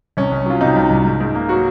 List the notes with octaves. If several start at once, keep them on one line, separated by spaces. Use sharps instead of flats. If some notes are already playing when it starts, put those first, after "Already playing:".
C2 C#4
C2
F#3 F4
C3 D#4
C2
C2
G#2
G#2
A#3
F#3 F#4